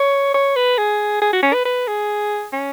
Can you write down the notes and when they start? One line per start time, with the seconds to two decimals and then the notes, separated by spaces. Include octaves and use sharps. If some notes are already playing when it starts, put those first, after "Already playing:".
Already playing: C#5
0.34 C#5
0.56 B4
0.78 G#4
1.22 G#4
1.33 F#4
1.43 C#4
1.54 B4
1.65 B4
1.87 G#4
2.53 C#4